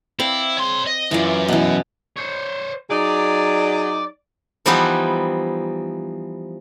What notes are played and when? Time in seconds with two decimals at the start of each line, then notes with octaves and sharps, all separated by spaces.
0.19 C4 E4 D5 F5
0.57 C#5 C6
0.87 D#5
1.11 F#2 E3 F4 D5
1.48 B2 E3
2.16 C5 C#5
2.90 F#3 D#4 G#4 D5
4.66 E3 F3 G3 B3 D#4 E4